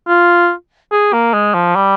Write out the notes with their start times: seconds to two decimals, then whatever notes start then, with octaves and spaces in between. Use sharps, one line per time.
0.08 F4
0.92 G#4
1.13 A#3
1.34 G#3
1.54 F3
1.76 G3